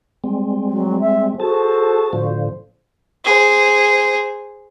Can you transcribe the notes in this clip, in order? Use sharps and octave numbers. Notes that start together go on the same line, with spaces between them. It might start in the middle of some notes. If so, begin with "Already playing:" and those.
G3 G#3 C4
F#3
E5
F#4 G#4 A4 C5 A5
A2 D3 F3 C5
G#4 C5